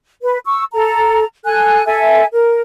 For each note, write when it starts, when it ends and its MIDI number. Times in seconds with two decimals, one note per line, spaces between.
0.23 0.39 71
0.45 0.63 85
0.45 0.63 88
0.73 1.24 69
0.73 1.24 82
1.45 1.85 69
1.45 1.85 80
1.45 1.85 90
1.86 2.25 69
1.86 2.25 76
1.86 2.25 80
2.33 2.61 70